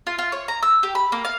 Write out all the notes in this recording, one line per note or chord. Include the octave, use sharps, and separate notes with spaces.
F4
F4
C#5
A#5
E6
G4
B5
A#3
F5